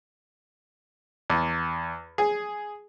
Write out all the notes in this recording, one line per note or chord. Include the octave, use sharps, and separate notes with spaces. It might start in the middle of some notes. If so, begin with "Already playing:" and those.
E2
G#4